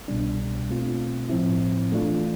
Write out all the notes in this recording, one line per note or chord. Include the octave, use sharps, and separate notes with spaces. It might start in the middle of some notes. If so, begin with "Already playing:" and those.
C2 B2 G3 D4
B2 A3 C4 F4
A2 F3 C4 E4
E3 A3 D4 F4